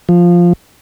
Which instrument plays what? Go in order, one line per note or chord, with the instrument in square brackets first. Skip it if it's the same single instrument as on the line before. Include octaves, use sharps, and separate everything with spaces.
[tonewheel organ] F3